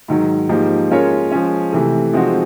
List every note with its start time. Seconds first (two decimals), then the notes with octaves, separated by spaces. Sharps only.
0.08 G#2 D#3 F#3
0.49 G#2 F3 A#3 D#4 G4
0.91 G#3 C#4 F4 A#4 C#5
1.32 F3 G#3 C#4
1.73 C3 E3 A3
2.13 F3 G#3 C4 D#4 F#4